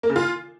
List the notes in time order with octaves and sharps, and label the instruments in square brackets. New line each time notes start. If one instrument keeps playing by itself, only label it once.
[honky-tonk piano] A#3
C#3
F4